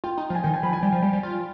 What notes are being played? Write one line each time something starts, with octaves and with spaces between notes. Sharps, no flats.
F4 G5
D#4
F3
G#5
D#3 G5
G#5
F3 B5
G#5
G3 G5
F3
G3
G3
F4